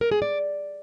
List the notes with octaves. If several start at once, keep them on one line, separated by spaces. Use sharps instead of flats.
A#4
G#4
D5